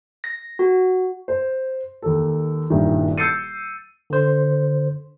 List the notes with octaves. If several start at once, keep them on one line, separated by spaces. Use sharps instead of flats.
A#6
F#4
C5
D#2 A4
D#1 G2 D#3 E4
E6 G6 A6 C7 C#7 D#7
D3 C5